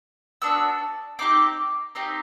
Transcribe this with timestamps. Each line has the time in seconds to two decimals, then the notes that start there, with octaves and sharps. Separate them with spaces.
0.42 B3 D4 F#4 E6
1.19 C4 D#4 G4 D6
1.95 C4 D#4 G4